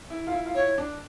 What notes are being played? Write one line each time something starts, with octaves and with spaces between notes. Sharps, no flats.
E4
F4
E4
F4
E4 C#5
D4